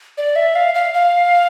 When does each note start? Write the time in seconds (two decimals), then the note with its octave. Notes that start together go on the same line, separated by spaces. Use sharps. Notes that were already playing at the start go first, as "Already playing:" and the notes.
0.18 D5
0.36 E5
0.55 F5
0.74 F5
0.94 F5